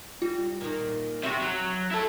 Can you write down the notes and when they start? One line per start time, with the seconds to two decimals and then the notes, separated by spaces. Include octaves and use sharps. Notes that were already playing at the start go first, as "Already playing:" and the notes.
0.22 G3 F4
0.61 A#2 D#3
1.23 C3 F#4 E5
1.41 F#3
1.91 E4 A4